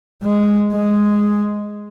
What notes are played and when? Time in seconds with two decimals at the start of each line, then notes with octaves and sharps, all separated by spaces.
0.23 G#3
0.73 G#3